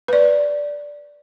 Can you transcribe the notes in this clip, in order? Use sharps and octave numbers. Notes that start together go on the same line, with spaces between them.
B4 D5